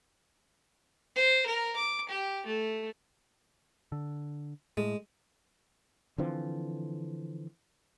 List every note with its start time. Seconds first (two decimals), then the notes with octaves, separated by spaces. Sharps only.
1.16 C5
1.46 A#4
1.76 D6
2.09 G4
2.46 A3
3.92 D3
4.77 A2 G#3
6.18 D3 E3 F3 C4